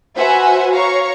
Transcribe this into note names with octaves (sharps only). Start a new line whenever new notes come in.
F#4 B4 C5 E5 F#5 G#5
C#5 F5 A#5 C#6